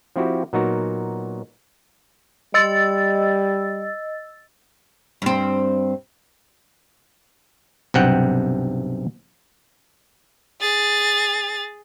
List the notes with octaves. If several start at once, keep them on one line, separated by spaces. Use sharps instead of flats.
F3 C4 E4 F#4 G4
A#2 F#3 B3 D#4 F#4 A#4
G3 D#5 E6 A6
G2 C4
B1 G2 C3 F#5 G5
G#4 A6